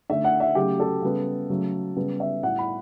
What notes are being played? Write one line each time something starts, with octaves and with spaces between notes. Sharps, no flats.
D3 A3 E5
F#5
E5
C#3 F#3 A3 G4
A4
C#3 G3 B3
C#3 F#3 A3
C#3 G3 B3
E5
A2 G3 B3 F#5
B5